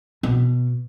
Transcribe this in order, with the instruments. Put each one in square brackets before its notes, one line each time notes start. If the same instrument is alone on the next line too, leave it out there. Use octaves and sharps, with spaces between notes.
[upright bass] B2